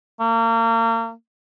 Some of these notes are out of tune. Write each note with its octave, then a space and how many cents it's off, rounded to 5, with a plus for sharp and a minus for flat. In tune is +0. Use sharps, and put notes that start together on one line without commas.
A#3 -35